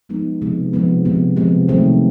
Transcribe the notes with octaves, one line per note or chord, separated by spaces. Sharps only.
F3 G#3 B3 D#4
C3 F3 G#3 B3
C3 F3 G#3 B3
C3 F3 G#3 B3
C3 F3 G#3 B3
C3 D#3 F#3 A3 C4